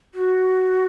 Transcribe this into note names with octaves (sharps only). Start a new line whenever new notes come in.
F#4